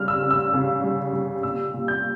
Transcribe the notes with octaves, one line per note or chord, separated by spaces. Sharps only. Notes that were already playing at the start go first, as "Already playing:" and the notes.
Already playing: C#3 G3 F6
E6
C#3
E6
C#3
G3
G3
A#2 E6
A#2
G6